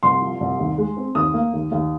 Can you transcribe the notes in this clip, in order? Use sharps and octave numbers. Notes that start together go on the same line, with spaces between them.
C2 C6
F3
C2
D#2
G#3
C4
D#2 D#6
A#3
D#2
D#2